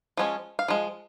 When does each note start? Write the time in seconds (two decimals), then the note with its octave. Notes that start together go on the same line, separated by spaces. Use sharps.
0.17 F3 G#3 C#4
0.59 F5
0.68 F3 G#3